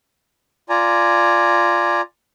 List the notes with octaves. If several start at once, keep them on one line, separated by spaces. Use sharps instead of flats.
F4 D5 G#5 A#5